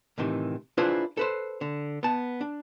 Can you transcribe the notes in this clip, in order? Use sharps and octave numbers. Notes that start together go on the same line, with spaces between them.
A2 C3 D#3 E3
D4 E4 F4 G#4 B4 C5
A4 B4 C5
D3
B3 A5
D4